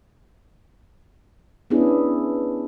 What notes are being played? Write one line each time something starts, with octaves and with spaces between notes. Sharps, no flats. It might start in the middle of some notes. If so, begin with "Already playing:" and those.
B3 C#4 D4 E4 G#4